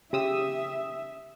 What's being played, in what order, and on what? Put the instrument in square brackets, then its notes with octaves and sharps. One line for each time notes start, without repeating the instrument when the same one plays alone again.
[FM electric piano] C#3 D#6 E6 [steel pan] G4 [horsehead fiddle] E5